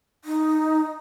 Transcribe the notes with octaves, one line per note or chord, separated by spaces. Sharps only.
D#4